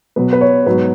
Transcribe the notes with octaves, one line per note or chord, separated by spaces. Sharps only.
B2 F#3 B3 B4
B4
C#5
G#2 F#3 B3 B4